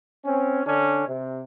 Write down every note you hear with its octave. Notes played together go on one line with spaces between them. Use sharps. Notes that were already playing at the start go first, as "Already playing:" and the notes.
C4 C#4
D3 C#4 D4
C3